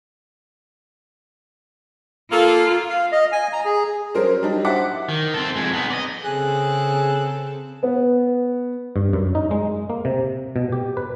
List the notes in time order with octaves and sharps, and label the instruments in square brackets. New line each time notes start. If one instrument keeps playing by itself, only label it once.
[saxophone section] A#3 A4 [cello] F4
[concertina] F5
D#5
G#5
A#5
G#4
[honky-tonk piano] F#3 C#4 A#4 C5
F#3 G3 D4 D#4
E4 C5 F#5 D6 B6
[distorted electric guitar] D#3
C4 A4
F2 G#3
B3 D#4
D5 D#5
[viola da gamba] C#3 C4 A4 [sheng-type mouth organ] G#4 F#6
[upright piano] B3
[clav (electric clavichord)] G2
F#2
D#4
G#3
A#3
C3
B2
G4
B4